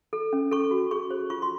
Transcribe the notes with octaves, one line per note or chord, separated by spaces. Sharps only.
A4
C#4
A4 C#6
F#4
G#4 C#6
C5
F4 C#6
C6